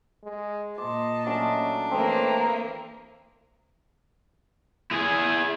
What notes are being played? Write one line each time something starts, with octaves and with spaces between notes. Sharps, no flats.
G#3
A#2 D#5 A5 C6 D6
F#3 A3 C#4 D4
E3 A3 A#3 C4 D#5
E4 G#4